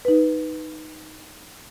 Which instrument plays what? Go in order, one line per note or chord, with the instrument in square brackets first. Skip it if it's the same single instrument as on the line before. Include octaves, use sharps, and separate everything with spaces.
[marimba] D#4 B4